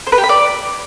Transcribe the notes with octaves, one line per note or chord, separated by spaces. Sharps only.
C5
B4
G4
B5
D5